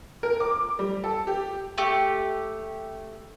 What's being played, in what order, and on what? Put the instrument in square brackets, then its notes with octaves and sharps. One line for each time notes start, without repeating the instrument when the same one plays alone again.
[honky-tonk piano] A#4
D6
G3
A4
G4
[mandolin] A3 G4